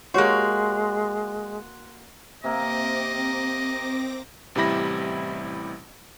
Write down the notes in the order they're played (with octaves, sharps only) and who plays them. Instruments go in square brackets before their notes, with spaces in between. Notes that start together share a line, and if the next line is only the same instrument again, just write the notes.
[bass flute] G#3 [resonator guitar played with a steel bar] A#3 F#4 [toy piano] G4 C#5 F#5 [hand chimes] C6 F#6
[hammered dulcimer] C3 A#3 [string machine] C4 D6 A#6 [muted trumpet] D#5
[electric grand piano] A1 C3 G3 E4 B5 A#6